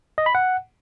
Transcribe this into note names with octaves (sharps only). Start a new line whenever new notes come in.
D#5
B5
F#5